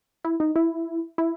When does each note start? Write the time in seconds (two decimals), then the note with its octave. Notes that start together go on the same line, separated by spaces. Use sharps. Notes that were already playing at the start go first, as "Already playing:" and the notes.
0.24 E4
0.40 D#4
0.56 E4
1.18 E4